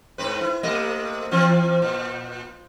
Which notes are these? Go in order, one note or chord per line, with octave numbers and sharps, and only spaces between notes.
G#2 C4 B4
E4
C3 A3 D#5
E3 C4 F4
A#2